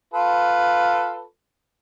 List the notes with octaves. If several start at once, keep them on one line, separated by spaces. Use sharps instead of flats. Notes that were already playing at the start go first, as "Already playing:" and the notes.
F4 A4 B4